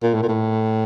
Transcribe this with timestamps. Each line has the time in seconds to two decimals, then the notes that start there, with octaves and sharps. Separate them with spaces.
0.03 A#2
0.14 A2
0.23 A#2
0.28 A2